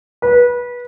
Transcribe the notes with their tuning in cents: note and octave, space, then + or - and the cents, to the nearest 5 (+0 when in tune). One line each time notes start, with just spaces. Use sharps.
B4 -25